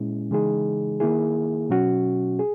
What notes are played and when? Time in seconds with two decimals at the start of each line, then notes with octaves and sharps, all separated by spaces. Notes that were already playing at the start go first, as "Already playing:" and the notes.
Already playing: A#2 G#3 C#4 E4
0.31 C#3 E3 G#3 D#4 G#4
1.00 D#3 A#3 E4 G#4
1.70 B2 F#3 C#4 F#4
2.39 G#4